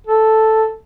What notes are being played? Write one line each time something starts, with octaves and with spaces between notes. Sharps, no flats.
A4